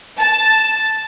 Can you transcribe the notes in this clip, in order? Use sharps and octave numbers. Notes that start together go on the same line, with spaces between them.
A5